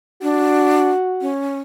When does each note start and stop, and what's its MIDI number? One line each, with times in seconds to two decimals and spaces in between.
0.22 0.88 62
0.22 1.29 66
1.21 1.59 61